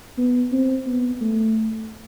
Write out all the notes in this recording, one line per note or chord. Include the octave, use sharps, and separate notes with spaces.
B3
C4
B3
A3